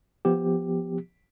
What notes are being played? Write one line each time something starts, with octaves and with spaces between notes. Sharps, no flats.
F3 B3 G4